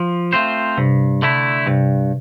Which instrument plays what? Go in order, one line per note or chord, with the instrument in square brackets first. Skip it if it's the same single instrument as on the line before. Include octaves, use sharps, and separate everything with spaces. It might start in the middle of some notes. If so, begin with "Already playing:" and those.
Already playing: [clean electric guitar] F3
A3 C4 F4 C5
[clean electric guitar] G2 [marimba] C3
[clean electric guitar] D3 A3 E4
[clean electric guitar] G2 [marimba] C3